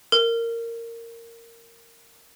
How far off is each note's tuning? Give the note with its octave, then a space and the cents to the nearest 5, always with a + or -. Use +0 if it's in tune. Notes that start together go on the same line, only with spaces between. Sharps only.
A#4 -15